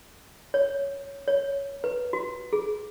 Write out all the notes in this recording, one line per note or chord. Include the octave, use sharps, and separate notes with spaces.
C#5
C#5
B4
F#4
G#4